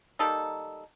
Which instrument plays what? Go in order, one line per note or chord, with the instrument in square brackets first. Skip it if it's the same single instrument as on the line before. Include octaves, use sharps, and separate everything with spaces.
[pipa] G3 A#3 D#4 A4